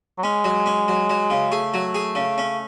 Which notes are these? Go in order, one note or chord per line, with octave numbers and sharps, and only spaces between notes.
F#3
G#3 C#4
F#3
C#4
F#3
F#3
C#3
A3 G#4
F#3
G#4
C#3
C#4